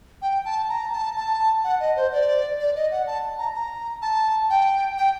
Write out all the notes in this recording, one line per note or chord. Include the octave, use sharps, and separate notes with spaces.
G5
A5
A#5
A5
A5
F#5
D#5
C5
D5
D5
D#5
F#5
A5
A#5
A#5
A5
G5
G5